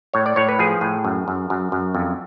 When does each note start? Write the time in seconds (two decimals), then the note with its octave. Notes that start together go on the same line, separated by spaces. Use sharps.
0.13 A2 C#5
0.26 D5
0.36 A2 C#5
0.49 B4
0.59 F3 G#4
0.81 A2
1.05 F#2
1.28 F#2
1.50 F#2
1.72 F#2
1.95 F2